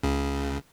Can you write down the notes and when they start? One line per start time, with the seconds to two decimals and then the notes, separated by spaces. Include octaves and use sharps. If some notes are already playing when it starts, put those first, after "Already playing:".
0.03 C#2 C#3